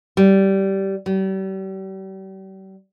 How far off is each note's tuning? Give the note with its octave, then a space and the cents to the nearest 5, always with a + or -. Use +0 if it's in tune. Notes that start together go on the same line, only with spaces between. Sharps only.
G3 -15
G3 -40